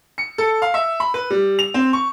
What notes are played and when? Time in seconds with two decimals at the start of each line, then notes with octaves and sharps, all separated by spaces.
0.18 C#7
0.38 A4
0.62 F5
0.74 E5
1.00 B5
1.14 B4
1.30 G3
1.59 F7
1.74 C4
1.93 C#6